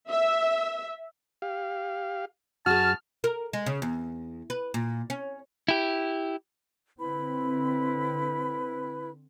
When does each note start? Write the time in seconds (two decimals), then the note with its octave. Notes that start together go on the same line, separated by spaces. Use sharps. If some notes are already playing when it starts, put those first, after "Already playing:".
0.11 E5
1.42 G4 F5
2.66 F#2 F#4 G#4 A5 F6
3.24 A#4
3.53 G#3
3.66 C#3
3.82 E2
4.50 B4
4.74 A#2
5.10 C#4
5.68 E4 G4
6.98 D3 C4 E4 B4 B5